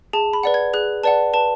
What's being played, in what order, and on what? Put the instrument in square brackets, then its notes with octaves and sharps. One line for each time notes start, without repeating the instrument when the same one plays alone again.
[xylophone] G#4 A5
B5
B4 D5 F#5
G#6
G#4 F#6
B4 D5 F#5 A5
B4 A5